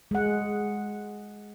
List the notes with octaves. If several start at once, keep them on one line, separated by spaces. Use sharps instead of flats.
G#3 F#5